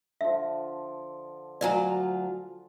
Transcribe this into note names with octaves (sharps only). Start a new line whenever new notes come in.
D3 F3 E5
D2 F#3 F4 D5 G#5 A#5